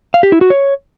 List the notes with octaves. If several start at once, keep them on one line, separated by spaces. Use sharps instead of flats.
F5
G4
E4
F#4
C#5